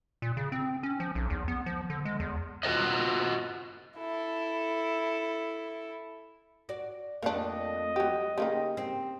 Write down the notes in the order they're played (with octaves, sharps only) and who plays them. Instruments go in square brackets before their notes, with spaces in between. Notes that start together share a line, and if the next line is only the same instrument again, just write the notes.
[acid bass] A#2
C#3
C4
C#4
F3
B1
E2
B3
F3
D3
G#3
E2
[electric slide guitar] F4 F#4 A#4 D5 D#5
[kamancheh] E4 A4
[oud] F#4 D5
[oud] F2 A3 [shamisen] A#3 D4 [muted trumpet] D#5
[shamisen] F#3 G4
[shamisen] C#3 A#3 D#4 [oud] G4
[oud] C4